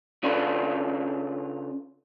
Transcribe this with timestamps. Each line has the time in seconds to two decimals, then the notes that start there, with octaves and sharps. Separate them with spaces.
0.23 C#3 C#4 D4 F4 A4 B4